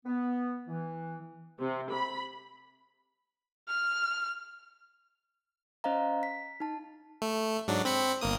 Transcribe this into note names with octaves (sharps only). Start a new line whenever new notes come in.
B3
E3
C3
B5
F6
C#4 C5 D#5 F5 A#5
B6
D#4 A5
A3
G#2 F#3 D4
C4 B5 C#7
G1 A#3 D#6